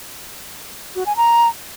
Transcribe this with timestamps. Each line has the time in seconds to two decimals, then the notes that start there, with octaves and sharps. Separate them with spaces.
0.96 F#4
1.06 G#5
1.17 A#5